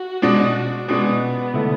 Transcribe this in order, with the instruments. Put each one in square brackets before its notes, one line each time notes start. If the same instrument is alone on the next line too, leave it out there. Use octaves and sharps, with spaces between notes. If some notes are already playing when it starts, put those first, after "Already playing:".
Already playing: [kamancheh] F#4
[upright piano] B2 G#3 D4
[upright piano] B2 G#3 D4 [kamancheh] B3
[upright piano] D3 A3 E4 A4